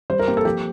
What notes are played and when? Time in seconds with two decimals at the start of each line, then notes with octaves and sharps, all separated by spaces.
0.10 G3 C5
0.19 A#4
0.28 A#3 G4
0.37 A4
0.45 F3 G4